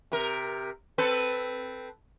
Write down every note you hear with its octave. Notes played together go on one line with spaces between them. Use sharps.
C3 A#4
C4 A4 B4